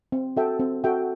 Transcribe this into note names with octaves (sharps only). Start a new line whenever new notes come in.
C4
F#4 A4 E5 G5
C4
F#4 A4 E5 G5